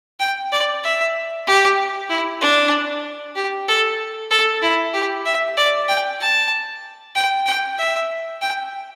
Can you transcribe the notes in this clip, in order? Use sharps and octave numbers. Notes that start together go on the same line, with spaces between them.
G5
D5
E5
G4
E4
D4
G4
A4
A4
E4
G4
E5
D5
G5
A5
G5
G5
E5
G5